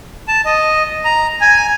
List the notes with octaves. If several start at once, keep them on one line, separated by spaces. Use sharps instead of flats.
A5
D#5
A#5
G#5